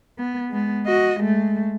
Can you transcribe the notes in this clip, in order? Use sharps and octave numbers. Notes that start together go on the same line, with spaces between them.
B3
G#3 B3
F#4 D#5
G#3 A3